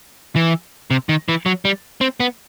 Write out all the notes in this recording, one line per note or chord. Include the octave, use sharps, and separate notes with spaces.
E3
C3
D#3
E3
F#3
G3
C4
B3